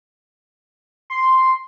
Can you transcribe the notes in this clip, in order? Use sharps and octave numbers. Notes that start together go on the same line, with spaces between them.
C6